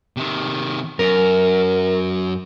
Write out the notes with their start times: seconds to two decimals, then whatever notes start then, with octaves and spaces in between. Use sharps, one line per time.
0.17 C3 D#3
0.99 F#2 A#4